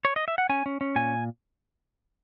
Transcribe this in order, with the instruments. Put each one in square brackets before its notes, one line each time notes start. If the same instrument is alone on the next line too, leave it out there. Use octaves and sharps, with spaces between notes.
[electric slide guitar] C#5
D#5
E5
F#5
C#4 G#5
C#4
C#4
A#2 G#5